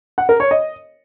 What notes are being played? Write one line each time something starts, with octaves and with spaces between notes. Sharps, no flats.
F#5
A#4
C#5
D#5